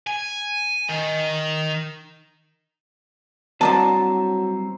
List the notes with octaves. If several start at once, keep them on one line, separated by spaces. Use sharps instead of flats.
G#5
D#3
D3 F#3 G3 C4 E4 D5 A5 A#5